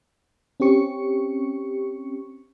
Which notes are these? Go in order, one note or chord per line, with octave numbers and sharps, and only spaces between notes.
C4 C#4 G4 C#6 C#7